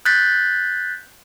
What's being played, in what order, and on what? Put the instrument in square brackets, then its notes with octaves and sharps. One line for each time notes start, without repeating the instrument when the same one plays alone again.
[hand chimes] F#6 G6 A6 B6